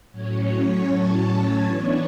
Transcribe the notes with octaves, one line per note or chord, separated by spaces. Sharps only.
A2 F#3 C#4 C#5
A5
C#5
E3 B3 D4